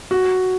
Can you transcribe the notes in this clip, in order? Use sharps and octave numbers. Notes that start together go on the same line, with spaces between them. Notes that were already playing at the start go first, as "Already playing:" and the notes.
F#4